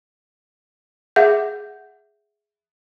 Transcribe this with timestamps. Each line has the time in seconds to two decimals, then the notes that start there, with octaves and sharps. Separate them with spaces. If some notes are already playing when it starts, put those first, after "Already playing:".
1.16 G#4 E5 F#5 G6